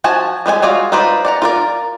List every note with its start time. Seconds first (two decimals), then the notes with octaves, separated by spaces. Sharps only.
0.04 F3 F#4 G#5 A5
0.46 G3 G#3 B4 G#5
0.62 G#3 F4 F#4 D5 F5
0.92 D#4 F4 B4 C5 D5
1.25 D5 F#5 A#5
1.42 F4 A#4 D5